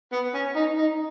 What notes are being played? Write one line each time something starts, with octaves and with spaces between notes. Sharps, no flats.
B3
C#4
D#4
D#4